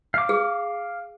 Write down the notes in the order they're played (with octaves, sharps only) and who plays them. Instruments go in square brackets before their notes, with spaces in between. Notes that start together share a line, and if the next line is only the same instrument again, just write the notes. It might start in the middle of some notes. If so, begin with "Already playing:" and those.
[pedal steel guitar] F5 D6
[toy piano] G#4